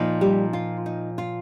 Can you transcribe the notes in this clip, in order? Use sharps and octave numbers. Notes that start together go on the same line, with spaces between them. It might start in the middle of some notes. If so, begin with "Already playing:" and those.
Already playing: A#2 F3 D#4
G3 G4
F4
D#4
F4